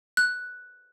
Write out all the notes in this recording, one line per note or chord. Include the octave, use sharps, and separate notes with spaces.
F#6